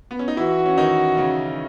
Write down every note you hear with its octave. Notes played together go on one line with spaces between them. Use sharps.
B3
C#4
D#4
E3 E4 F#4
C#4
D#3 D#4
C#3 C#4